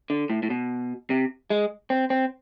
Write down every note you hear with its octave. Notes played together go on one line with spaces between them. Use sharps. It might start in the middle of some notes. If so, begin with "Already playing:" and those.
D3
A2
A2
B2
C3
G#3
C4
C4